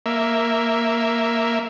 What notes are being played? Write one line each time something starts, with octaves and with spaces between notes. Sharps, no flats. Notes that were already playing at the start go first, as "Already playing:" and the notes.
A#3 E5